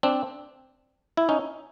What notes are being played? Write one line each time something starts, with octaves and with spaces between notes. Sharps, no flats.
C4 D4
E4
C#4 D#4